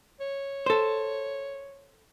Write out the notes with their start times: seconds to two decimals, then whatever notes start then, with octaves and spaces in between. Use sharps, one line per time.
0.21 C#5
0.66 A4 C5